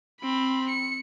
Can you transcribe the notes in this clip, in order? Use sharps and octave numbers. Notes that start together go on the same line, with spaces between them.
C4 B5
C#7